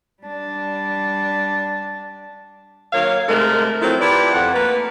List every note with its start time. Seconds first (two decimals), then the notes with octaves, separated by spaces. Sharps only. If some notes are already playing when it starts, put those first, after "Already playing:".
0.23 G3 D4
2.93 D#3 F#3 A#3 C#5 F5
3.28 G#2 C3 G#3 A3 A#4
3.82 F3 F#3 A3 C4 E4
4.00 E4 F4 G4 A4 B4 D5
4.33 F2 F#5
4.54 A3 A#3 A#4 B4